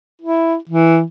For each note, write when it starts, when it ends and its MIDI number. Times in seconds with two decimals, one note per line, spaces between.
0.22 0.56 64
0.69 1.02 52